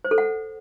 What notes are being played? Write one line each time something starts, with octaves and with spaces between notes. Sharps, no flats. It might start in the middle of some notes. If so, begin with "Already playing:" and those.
C5
A4
F#5